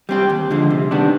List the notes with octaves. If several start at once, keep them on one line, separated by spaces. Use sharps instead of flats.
G3 C4 G4
D#2
D3 F3 G#3
C3
D#3 G3 B3 D4